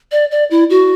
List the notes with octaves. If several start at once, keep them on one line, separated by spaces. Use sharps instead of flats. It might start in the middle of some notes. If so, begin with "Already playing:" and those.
D5
D5
E4
F#4